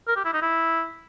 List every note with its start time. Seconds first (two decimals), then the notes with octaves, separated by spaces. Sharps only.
0.08 A#4
0.16 G4
0.25 E4
0.34 D#4
0.42 E4